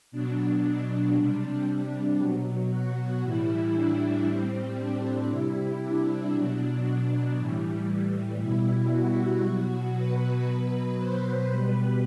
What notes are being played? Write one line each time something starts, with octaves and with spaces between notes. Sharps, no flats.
B2 F#3 D4
C3 G3 D4
B2 F#3
F#4
A2 E3 G3 E4
D4
A2 G3 C4
D4
C3 G3 E4
D4
B2 F#3 D4
A2 E3 G3
B2 G3 E4
F#4
B2 F#3
B4
B2 F#3 B4
C5
B2 G3 B4